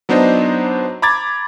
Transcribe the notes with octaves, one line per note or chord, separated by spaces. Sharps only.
F#3 B3 D4 D#4 C5 D#5
A#5 B5 D6 G#6 A6